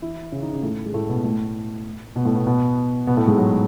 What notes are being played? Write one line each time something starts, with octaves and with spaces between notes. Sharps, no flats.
E3 E4
C#3 C#4
D#3 D#4
C#3 C#4
A2 A3
G#3
A2 A3
B2 B3
A2 A3
B2 B3
A2 A3
B2 B3
B2 B3
B2 B3
A2 A3
G#2 G#3
F#3